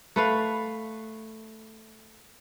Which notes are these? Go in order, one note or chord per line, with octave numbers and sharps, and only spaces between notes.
A3 B4 F5